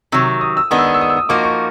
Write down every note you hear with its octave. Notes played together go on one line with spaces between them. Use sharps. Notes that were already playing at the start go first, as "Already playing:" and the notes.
C3 D#3 F#3 E6
D#6
E6
D#3 G#3 B3 D4 D#6
E6
D#6
E6
D#6
E6
D#6
F3 A#3 D#4 F#4 D6
C#6